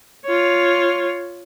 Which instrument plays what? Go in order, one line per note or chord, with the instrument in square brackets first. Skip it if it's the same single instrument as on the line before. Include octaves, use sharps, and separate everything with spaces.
[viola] F4 C#5